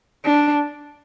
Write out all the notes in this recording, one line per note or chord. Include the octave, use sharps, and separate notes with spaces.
D4